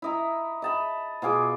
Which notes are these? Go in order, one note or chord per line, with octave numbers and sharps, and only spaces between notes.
E4 D#5 A#5
D#5 A5 B5
B2 F4 G#4 D6